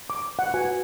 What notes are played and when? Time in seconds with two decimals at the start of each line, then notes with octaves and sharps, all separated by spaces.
0.10 D6
0.39 F#5
0.54 F#4 B4 G#5